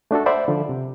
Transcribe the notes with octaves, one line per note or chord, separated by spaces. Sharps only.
A3 D4 F#4 A4
C5 D5 E5 F#5 B5
D3 F3
C3